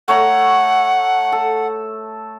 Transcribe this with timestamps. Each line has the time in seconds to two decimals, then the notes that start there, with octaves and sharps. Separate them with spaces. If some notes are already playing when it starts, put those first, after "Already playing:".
0.08 A3 C#5 F#5 A#5
1.32 A4